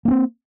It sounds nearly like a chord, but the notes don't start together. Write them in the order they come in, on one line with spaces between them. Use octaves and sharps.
A#3 C#4 C4